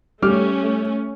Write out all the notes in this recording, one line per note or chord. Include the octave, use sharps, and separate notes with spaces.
G3 A3 C#4 D6 F6